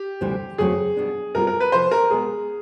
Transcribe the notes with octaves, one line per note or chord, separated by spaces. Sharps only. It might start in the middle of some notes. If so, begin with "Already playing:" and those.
Already playing: G4
D2 C3 E3 G3 C4
E2 C#3 F#3 A3 C4 G#4
B2 G3 B3 D4
B2 G3 C4 F4 A4 A#4
A#4
B4
E2 C3 F3 C5
A#4
B2 G#3 B3 G#4